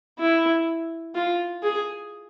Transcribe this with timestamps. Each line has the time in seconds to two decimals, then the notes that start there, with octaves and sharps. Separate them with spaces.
0.19 E4
1.15 F4
1.63 G#4